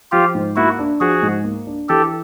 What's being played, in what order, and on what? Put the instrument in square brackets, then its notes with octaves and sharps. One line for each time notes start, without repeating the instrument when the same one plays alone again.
[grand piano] F3 [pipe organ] F4 G4
[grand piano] G#2
[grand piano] A#3 [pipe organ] E4 F#4
[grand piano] D4
[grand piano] F3 [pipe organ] F#4 G#4
[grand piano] G#2
A#3
D4
[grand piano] E3 [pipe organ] G4 A4